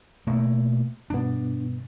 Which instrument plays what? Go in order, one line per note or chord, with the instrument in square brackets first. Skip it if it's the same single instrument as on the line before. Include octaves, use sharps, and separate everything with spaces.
[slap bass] B2 A3 A#3
[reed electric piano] G2 B2 B3 [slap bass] D4